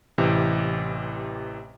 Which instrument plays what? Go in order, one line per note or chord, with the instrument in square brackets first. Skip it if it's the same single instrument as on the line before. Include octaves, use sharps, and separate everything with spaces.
[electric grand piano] A1 C3 E3 G4